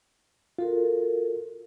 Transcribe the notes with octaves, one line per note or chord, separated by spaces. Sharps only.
F4 F#4 A4 A#4